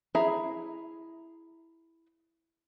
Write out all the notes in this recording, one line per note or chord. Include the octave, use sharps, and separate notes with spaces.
E4 G#4 E5 A#5